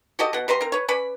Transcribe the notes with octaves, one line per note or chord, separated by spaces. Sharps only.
F#4 G4 A4 D#5
B2 F#5
G3 B4 A#5 C6
C4 A#4
B4 C#5
C#4 B4 D5 B5